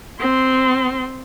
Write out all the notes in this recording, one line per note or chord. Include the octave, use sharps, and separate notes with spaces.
C4 C6